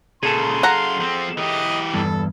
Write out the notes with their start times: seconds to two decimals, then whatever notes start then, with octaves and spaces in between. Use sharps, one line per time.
0.23 A#2 C#3 G#4 A4 C6
0.63 F#2 F5 F#5 A#5
1.01 F3 C4
1.38 E3 G4 D#5
1.94 E2 G2 A4